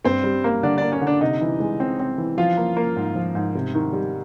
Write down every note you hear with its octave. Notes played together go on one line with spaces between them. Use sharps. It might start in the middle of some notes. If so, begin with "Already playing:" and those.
G2 C4 C5
G3
A#3
D3 D4 D5
A#3 D4 D5
C#4 C#5
D3
D4 D5
C3 D#4 D#5
E3
G#3
C4
C4
E3
F3 F4 F5
A#3
A#3
G#2
F3
G#2
C3
D#3
G3